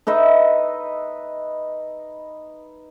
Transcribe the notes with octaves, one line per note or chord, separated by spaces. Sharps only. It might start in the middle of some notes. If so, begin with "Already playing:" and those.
D#4 B4 D#5 E5